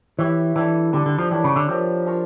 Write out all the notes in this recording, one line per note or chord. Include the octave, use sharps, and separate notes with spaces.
E3 E4 G4 C#5
E3 G3 D4 A4
D3 G3 D4 A4
D3
F3
E3 D4 G4 A#4 C#5
C#3
D3
F3 D4 G4 A#4 C#5
D4 F4 A#4 C#5